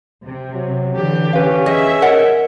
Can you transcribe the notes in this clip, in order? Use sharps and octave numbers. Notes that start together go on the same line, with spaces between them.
C3
F#3
D3 E3 G4
C#4 B4 F5
G#4 D#5 E5
A#4 C#5 D#5 F#5